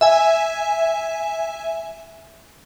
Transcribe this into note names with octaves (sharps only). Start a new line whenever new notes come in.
E5 G#5